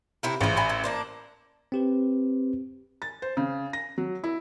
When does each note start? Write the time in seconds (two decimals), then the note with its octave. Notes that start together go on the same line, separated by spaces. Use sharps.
0.23 C3 E4 A#4
0.41 A1 C#3 F3
0.57 E4 G#5 A#5
0.69 E4
0.84 A#3 D4 C5
1.72 C4 G4 B4
3.02 A6
3.22 C5
3.37 C#3
3.73 A#6
3.98 F#3
4.24 E4